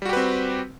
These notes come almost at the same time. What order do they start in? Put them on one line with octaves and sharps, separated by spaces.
G3 F#4 G4 B4 C4